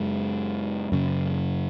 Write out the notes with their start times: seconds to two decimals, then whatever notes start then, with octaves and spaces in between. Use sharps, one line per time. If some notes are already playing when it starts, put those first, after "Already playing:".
Already playing: F#2 C#3 G#3
0.92 F#2 C#3